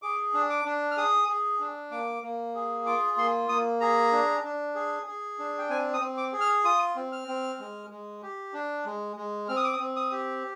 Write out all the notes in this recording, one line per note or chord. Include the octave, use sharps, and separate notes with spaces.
G#4 D6
D4
D6
D4
F6
G#4 D#6
G#4
D4
A#3 D6
A#3
G#4
F4 D6
A#3 C6
A#3 D#6
G#4 A#5
D4
D4
G#4
G#4
D4
G5
C4 G#5
D#6
C4
D6
G#4
F6
F4 D#6
C4
F6
C4
G#3
G#3
G4
D4
G#3
G#3
C4 F6
D#6
D6
D#6
C4
D#6
G4